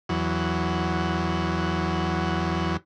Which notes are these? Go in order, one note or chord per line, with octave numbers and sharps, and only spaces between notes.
E2 F#3